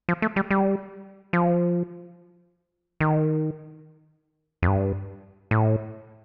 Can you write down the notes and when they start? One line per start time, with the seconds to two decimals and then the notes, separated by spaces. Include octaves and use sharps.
0.09 F3
0.22 A3
0.36 G3
0.51 G3
1.33 F3
3.01 D#3
4.62 F2
4.67 G2
5.51 A2